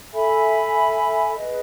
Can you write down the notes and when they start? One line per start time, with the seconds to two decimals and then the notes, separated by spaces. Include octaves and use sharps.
0.12 A4 E5 G#5 B5
1.35 G#4 B4 D#5